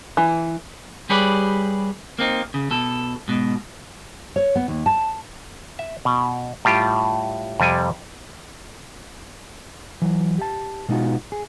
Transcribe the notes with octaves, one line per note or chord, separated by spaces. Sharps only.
E3
G3 G4 G#4 B4 C#5 D5
A#3 C4 D#4
C#3
B2 A4
G#2 B2
C#5
B3
D#2
A5
E5
B2
A2 G3 F4 G4
F2 C3 G3 G#5
E3 F#3
G4 A5
B2 G#3 B3 D#4 F4 F#4
G#4